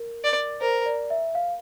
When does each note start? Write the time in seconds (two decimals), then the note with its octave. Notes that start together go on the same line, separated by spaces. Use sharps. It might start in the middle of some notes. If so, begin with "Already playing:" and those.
Already playing: A#4
0.24 D5
0.60 A#4 C5
0.86 D5
1.10 E5
1.35 F5